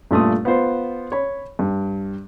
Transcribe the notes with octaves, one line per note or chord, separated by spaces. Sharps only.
G2 A#2 A3 F4 D#6
B3 F4 C5
C#5 B5
G2